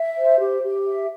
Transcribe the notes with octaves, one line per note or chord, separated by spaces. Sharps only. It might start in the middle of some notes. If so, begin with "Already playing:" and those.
Already playing: E5
C5
G4
G4
E5